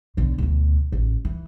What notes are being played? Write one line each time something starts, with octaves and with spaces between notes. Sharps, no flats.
B1 D3
D2 B2
A1
E3